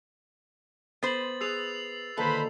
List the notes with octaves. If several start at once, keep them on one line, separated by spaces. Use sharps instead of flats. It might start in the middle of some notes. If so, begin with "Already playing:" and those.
B3 C5 A6 F#7
G#4 B4 E6 C7 F7
A#2 D3 D#3 A4 B4 C5 B5